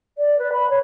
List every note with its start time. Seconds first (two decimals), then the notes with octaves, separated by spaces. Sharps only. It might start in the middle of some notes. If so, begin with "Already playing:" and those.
0.18 D5
0.39 B4
0.52 B5
0.70 C#5